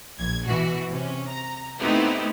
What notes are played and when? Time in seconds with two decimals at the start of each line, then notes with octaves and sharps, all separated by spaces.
0.18 A#1 G#6
0.47 B2 E3 F#4
0.89 C3 C#4
1.29 A#5
1.79 A3 B3 C4 D#4 E4 G4